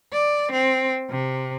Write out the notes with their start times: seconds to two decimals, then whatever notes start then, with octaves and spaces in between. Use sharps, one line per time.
0.13 D5
0.52 C4
1.10 C3